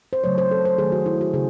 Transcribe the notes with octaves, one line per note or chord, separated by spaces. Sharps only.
C5
C#3 F#3 A3 C#5
C5
A4
C5
D#3 F#3 A3 G#4
F#4
E4
F#4
C#3 G#4